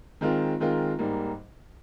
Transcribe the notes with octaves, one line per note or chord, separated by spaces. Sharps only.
D#3 G#3 C4 F4 A#4
D#3 G#3 C4 F4 A#4
G#2 G3 A#3